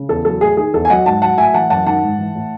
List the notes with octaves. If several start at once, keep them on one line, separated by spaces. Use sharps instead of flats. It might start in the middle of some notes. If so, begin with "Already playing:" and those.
Already playing: C#3
E2 A4
F#3 A4
A2 G#4
D#3 G#4
E2 A4
G#5
F#3 D#5 F#5
G#2 F#5 A5
F#3 F#5 A5
A2 E5 G#5
E3 F#5 A5
F#2 F#5 A5
D#3 F#5 A5
G#2
E3
A2